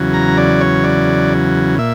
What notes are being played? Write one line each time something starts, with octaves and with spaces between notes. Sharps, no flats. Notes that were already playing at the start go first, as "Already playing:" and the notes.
Already playing: E2 C#3 F#3
A#5
D5
C#5
D5
A#2 E5